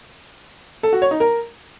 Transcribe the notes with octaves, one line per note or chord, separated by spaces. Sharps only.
A4
F#4
C#5
D#4
A#4